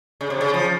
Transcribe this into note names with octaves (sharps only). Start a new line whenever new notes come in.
C#3
C3
C#3
F3